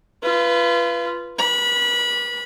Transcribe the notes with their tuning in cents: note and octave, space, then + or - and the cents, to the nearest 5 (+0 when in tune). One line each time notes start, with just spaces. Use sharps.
F4 -30 B4 +0
B4 -45 B5 -20